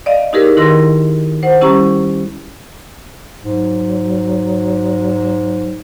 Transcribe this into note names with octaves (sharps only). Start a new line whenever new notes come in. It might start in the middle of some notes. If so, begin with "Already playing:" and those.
D5 D#5 F5
D#4 E4 G4 G#4 A#4 B4
D#3 E4 A#4 C6 A#6
C5 F#5
G3 C#4 E4 G4 A#5 C#6
G#2 F#3